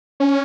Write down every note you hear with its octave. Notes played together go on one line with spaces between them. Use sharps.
C#4